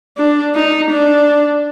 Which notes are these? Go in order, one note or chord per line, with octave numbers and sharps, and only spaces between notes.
D4
D#4
D4